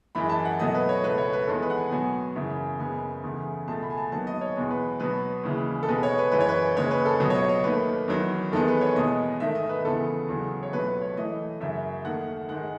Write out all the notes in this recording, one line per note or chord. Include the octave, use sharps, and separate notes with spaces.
F#2 E3 G#3 B5
A5
F#5
B2 F#3 A3 D#5
B4
C#5
C#2 B2 A3 B4
C#5
B4
E2 D#3 G#3 B3 A4
B4
F#5
G#5
B2 F#3 B3 G#5
F#2 C#3 E3
F#2 C#3 G#3 B3 G#5
E2 C#3 E3 A3
C#2 B2 A3 A5
B5
G#5
A5
D#2 D#3 F#3 B3 A5
D#5
C#5
E2 B2 G#3 B3
B4
B2 F#3 B3 B4
D#2 C#3 E3 G#3
A4
B2 G#3 B3 B4
C#5
B4
F#2 E3 G#3 B4
C#5
B4
D#2 C#3 G#3 C#5
B4
A4
C#2 B2 F#3 B3
C#5
D#5
C#5
D#2 D#3 A3 B4
E2 D#3 F#3
E2 D#3 G#3 B3 A4
B4
C#5
E2 B2 G#3 B3 D#5
G#2 D#3 A3 E5
D#5
B4
E2 C#3 E3 B3 A4
E2 C#3 F#3
C#5
C#2 B2 F#3 A3 B4
B4
C#5
A2 E3 A3 D#5
F#2 C#3 F#3 E5
D#2 D#3 A3 F#5
G#2 D#3 G#3 F#5